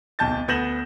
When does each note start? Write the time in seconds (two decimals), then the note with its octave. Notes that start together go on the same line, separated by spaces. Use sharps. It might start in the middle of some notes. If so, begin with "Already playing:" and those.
0.19 D1 B1 A5 G6 A6
0.48 D2 B3 G6 A#6 E7 F#7